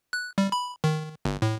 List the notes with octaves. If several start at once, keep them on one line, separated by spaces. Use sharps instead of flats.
F#6
G3
B5
D#3
G1
A2